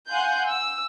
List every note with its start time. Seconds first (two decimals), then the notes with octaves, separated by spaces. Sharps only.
0.10 F5 F#5 G#5 C6 F#6 G6
0.47 E6